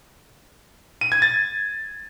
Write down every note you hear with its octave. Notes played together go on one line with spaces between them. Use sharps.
D#7
G#6
A6